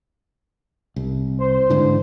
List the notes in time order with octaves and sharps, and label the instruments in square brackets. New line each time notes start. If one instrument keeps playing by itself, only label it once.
[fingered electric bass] C2
[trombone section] C5
[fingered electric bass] G#2 D3 E3